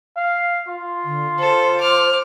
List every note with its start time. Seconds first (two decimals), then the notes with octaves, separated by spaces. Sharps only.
0.17 F5
0.68 F4
1.04 D3
1.39 A4 C5
1.81 D6 F6